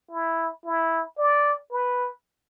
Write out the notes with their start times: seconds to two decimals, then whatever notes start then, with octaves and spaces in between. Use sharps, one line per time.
0.11 E4
0.65 E4
1.18 D5
1.72 B4